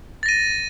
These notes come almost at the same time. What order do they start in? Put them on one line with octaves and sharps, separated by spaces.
A6 A#6 D#7